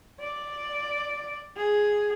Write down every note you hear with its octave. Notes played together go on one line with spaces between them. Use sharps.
D5
G#4